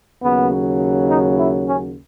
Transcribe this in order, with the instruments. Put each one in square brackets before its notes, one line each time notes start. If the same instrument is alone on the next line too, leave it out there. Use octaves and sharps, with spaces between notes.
[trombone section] D#2 C#3 F#3 B3
D#4
E4
C#4